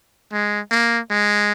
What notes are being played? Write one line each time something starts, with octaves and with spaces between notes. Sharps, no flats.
G#3
A#3
G#3